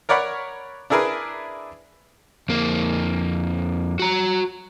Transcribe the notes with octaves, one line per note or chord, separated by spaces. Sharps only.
A#4 C#5 D5 F#5 B5
D4 E4 G#4 A#4 B4
F2 A#3
F#4 A#5